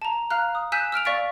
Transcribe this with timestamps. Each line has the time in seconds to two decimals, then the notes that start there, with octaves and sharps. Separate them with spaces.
0.02 A5 A#5
0.30 F5 A#5 F6 F#6
0.55 D#6
0.72 G#5 E6 F#6 G6 B6 E7
0.92 E6 F6 D7 F7
1.05 D5 F5 C#6 A6 B6 D7